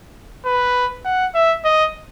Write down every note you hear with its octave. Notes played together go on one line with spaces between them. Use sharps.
B4
F#5
E5
D#5